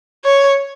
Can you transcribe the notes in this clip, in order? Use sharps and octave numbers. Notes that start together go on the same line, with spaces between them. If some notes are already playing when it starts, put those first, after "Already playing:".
C#5